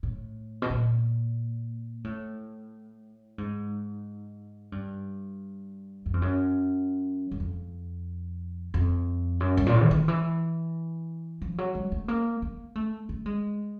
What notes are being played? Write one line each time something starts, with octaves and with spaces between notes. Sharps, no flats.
A2
B2
A#2
A2
G#2
G2
F#2
F2
F#2
F#2
F2
F2
F#2
G2
A#2
A2
E3
D#3
E3
F3
F#3
G#3
A3
A#3
A#3
A3
A3
G#3